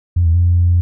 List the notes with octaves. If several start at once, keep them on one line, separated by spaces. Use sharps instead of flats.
F2
E2
F2